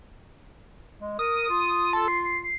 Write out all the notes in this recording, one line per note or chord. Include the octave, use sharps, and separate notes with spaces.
G#3
A#4 D#6
F4
A4
C7